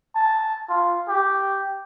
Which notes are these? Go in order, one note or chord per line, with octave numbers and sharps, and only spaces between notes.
A5
F4
G4